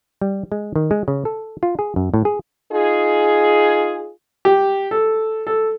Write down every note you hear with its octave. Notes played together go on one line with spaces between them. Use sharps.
G3
G#3
D#3
G#3
C#3
A4
F4
G#4
F#2
A2
G#4
D#4 F4 G#4
G4
A4
A4